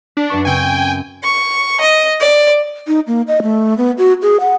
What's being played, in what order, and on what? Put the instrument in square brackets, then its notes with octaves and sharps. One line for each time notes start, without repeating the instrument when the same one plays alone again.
[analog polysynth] D4 [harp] B6
[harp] F#2 B4 C#6
[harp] C#3 C4 [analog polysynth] G5 G#5
[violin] C#6
D#5
D5
[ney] D#4
A#3
D#5
A3
B3
F#4
G#4
F#5